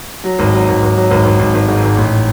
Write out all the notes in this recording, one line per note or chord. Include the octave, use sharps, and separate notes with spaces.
F#3
G#1
F#3
G#1
G#1
F#3
G#1
G#1
G#1
G#1
G#2
G#1
A1